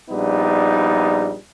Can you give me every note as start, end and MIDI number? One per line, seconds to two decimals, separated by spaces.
0.10 1.35 34
0.10 1.35 55
0.10 1.35 59
0.10 1.35 63